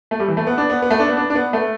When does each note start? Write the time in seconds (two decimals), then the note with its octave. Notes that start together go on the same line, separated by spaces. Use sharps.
0.11 A3
0.20 G3
0.28 E3
0.37 A3
0.47 B3
0.58 D4
0.70 B3
0.82 B3
0.90 A3
1.00 D4
1.09 B3
1.17 D4
1.30 D4
1.35 B3
1.53 A3